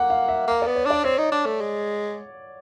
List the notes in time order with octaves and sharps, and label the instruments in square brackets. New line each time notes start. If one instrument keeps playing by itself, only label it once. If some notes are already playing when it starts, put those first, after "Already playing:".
Already playing: [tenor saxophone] A#3 [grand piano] F#5
[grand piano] F5
E5
[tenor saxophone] A#3
[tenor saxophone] B3 [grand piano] D5
[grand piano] C#5
[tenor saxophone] D4 [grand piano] D5
[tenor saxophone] C4 [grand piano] C#5
[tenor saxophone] D#4
D4
A3
G#3